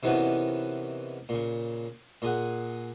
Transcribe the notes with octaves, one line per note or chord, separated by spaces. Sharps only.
C3 D#3 E3 B3 C#4 F#4
A#2 C#3
A#2 G#4 F#5